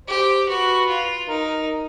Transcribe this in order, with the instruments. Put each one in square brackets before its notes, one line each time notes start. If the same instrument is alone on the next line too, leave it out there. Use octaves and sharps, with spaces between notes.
[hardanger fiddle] G4 [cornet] C5
[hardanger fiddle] F#4 [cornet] B4
[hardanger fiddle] F4
[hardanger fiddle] D#4 [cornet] A#4